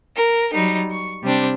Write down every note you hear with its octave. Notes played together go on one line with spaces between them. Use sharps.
A#4
F#3 G3 D#4
C#6
C3 G3 C4 D4